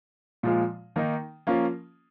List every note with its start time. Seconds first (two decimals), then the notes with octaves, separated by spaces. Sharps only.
0.43 A#2 F3 G#3 F4
0.96 D#3 A#3 D#4
1.47 F3 A#3 C#4 F4